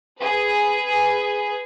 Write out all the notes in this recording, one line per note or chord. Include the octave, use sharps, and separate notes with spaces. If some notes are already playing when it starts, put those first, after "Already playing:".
G#4 B4